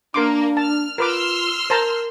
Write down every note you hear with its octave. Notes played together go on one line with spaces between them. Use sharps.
A#3 D4 A#4 C6 D6
A5 F6
F4 A#4 B4 C6 D6 E6 F6
A#4 C5 A5 A#5